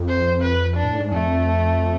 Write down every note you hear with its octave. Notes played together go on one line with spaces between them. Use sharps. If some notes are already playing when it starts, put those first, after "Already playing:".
Already playing: F2
C5
B4
D4
A2
G#2
F2 A3